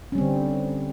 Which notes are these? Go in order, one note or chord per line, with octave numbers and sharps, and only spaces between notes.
D3 G3 C4 C#4